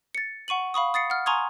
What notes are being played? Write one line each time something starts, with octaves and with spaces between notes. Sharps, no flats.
A6 C#7
F#5 C#6 D#7 F#7
F5 B5 C#6 D#6
D#6 A6 C7 C#7
F#5 F6
G#5 A#5 C6 C#6 D#6 G#6